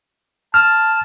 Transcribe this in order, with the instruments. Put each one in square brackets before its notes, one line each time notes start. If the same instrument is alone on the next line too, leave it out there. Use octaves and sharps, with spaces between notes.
[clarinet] A5 [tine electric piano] F6